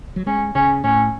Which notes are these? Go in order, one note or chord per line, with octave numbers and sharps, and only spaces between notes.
F#3
G#3 C#4
C#3 C#4
A2 C#4